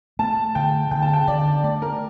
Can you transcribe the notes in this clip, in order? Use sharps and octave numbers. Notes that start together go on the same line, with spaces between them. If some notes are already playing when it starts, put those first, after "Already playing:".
A3 A5
D3 G5
D3 G5
A5
G5
D3 D5
A3 D5
A#4